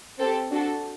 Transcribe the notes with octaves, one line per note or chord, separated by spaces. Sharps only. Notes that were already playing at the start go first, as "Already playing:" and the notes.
C4 G4 A4
D4 F#4 A4